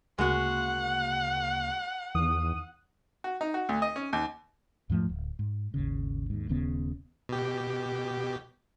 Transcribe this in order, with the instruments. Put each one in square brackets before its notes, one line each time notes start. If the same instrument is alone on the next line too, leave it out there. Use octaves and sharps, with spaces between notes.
[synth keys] D2 C#3 A#3 [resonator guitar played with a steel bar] G#3 F#4 [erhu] F#5
[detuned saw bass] E2 [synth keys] D#3 D#6 D#7
[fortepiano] F#4
D#4
F#4
D2
D#5
C#4
D#2
[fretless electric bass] E2 G#2 F3 A3
D1
G#2
G#1 D#2 C#3
D#2 G#2
D#1 D#2 C#3 B3
[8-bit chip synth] B2 G4